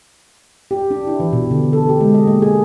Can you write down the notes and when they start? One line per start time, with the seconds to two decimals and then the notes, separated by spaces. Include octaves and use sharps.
0.71 G4
0.91 D4
1.07 E4
1.20 E3
1.33 B2
1.51 D3
1.73 A4
1.89 G4
2.01 G#3
2.14 D#5
2.27 A#3
2.42 G#4